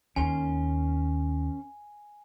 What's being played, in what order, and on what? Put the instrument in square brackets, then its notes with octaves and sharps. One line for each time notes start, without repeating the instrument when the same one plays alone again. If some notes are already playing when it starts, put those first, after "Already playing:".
[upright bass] D#2 [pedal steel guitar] C#4 A#4 C6 [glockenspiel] G#5